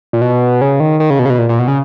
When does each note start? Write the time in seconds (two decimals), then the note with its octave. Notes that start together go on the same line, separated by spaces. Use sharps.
0.13 A#2
0.22 B2
0.61 C#3
0.80 D#3
1.00 D#3
1.10 C#3
1.19 B2
1.25 C#3
1.30 B2
1.39 A#2
1.49 A#2
1.59 B2
1.68 C#3